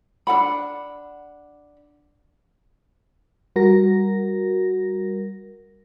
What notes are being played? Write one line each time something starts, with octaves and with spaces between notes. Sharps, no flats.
D4 A4 F#5 B5
G3 F#4 A#4 A#6